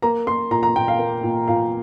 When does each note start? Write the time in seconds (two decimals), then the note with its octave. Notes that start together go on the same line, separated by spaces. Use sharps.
0.02 A#3 A#5
0.27 A#3 C6
0.51 A#2 A#5
0.63 A#5
0.76 A#2 G5
0.88 F5
0.99 A#3
1.23 A#2
1.48 A#2 F5